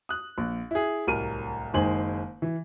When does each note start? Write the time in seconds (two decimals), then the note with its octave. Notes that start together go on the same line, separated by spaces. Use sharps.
0.09 D#6 F#6
0.38 A#1
0.71 E4 G#4
1.07 D1 C2 A#4 D#7
1.74 F#1 D#3 G#3 C5 G#5 F#7
2.42 E3